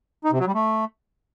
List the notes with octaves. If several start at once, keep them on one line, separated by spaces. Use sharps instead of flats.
D#4
C3
F#3
G3
A3